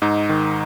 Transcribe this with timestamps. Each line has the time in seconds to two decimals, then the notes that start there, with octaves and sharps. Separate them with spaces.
0.02 G#2 D#4
0.29 D#3